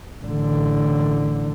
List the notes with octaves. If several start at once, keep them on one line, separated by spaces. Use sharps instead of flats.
A1 D3